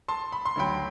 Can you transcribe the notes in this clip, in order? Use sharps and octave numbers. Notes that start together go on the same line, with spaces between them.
A5 C6
B5
C6
D2 D3 F#3 G5 B5